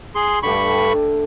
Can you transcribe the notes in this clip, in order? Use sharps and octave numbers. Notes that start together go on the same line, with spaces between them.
G#4 C6
G2 D3 A3 G4 B5 C#6